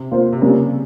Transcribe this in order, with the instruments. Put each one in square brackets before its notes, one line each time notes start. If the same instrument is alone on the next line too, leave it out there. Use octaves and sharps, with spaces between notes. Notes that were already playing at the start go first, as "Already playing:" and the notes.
Already playing: [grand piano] C3
[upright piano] A#3 F4 C5
[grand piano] C3
[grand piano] C#3 [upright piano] G3 A#3 C#4